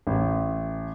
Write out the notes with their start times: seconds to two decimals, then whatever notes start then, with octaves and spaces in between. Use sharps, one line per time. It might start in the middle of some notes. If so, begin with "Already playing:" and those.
0.07 A1